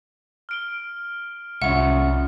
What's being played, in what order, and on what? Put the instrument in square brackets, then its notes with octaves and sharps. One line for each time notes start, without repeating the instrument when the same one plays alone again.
[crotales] F6 D7 G7
[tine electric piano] C2 C#6 [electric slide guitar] C#4 F4 E5 [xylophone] F#5